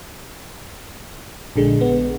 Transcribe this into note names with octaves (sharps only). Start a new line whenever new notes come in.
A#1 D3 G#3
B3